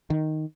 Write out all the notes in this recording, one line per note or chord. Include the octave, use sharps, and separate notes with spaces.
D#3